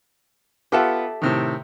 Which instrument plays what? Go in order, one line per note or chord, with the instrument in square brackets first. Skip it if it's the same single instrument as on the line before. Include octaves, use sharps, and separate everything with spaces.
[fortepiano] B3 F4 F#5 [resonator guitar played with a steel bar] G4 A4 E5
[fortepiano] A2 C3 D#3